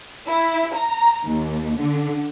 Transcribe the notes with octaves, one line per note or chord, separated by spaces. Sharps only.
E4
A#5
D#2
D3